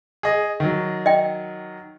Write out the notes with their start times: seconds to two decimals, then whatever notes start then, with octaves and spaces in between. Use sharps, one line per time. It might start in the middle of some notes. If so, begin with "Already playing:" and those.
0.23 G#4 D#5
0.60 D#3 F#3
1.06 D#5 G5